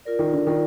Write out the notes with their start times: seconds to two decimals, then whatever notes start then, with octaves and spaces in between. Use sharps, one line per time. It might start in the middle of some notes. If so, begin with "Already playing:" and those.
0.05 F4 A#4 D5
0.19 D#3
0.33 D3
0.47 D#3 F4 A#4 D5